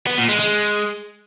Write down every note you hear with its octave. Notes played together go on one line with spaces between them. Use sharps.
B3
A#2
G#3
G#3